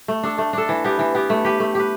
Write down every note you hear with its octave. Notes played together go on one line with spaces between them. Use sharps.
A3
D4 A4
A3
D4 A4
E3
B3 G4
E3
B3 G4
A3
G4 B4
A3
G4 B4